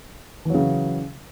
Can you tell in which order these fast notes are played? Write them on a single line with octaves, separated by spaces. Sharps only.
E3 F#3 C#3